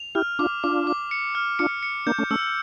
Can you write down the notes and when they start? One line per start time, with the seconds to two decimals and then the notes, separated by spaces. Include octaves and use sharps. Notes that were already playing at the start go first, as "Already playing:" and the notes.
Already playing: F7
0.15 E4 G4 F6
0.39 D4 F4 D6
0.64 D4 F4 D6
0.87 D6
1.11 C#7
1.35 F6
1.59 D4 F4 C#7
1.83 C#7
2.06 A#3 D4 G6
2.18 A3 C#4
2.31 A3 C#4 E6